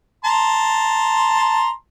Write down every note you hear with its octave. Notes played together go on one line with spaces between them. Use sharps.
A5 A#5 C6